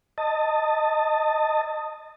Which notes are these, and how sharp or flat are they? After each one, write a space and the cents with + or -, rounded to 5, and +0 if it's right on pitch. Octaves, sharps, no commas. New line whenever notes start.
D#5 +0 A5 +25